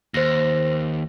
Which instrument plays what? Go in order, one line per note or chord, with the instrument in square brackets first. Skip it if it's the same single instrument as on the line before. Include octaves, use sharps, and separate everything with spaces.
[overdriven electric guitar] D#2 [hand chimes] C5 A#6